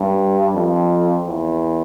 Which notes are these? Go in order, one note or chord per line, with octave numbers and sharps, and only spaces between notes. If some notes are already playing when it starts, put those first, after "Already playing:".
Already playing: G2
F2
E2